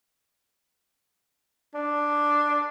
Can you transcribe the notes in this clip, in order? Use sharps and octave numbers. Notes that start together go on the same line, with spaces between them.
D4